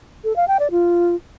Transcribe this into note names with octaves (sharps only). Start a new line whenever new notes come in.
A4
F5
G5
D5
F4